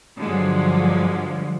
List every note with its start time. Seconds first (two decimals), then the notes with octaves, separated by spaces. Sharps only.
0.19 G2 D3 F3 F#3 G#3